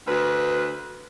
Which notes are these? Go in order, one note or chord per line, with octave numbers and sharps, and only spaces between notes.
D2 B4